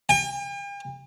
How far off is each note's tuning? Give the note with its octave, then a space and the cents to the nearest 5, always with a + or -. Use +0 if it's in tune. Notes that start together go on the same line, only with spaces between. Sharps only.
G5 +45